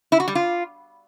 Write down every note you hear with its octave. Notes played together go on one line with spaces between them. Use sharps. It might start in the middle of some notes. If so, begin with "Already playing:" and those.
E4
F#4
G3
F4